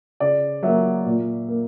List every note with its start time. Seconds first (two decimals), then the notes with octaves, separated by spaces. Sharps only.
0.20 C#3 D5
0.63 F#3 A#3 E5
1.06 A#2
1.48 A#3